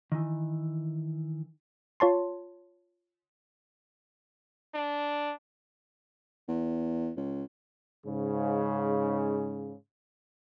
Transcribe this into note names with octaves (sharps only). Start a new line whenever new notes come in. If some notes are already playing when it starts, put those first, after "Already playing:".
D#3 E3
F4 C#5 A5 C6
D4
E2
C#2
G#2 C#3